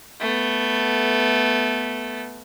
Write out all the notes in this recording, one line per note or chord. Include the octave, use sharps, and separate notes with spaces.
A3 B3